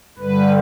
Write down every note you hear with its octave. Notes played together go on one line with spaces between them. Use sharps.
G2 D3 G3 B4